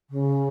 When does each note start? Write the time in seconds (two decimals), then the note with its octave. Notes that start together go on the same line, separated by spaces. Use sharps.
0.10 C#3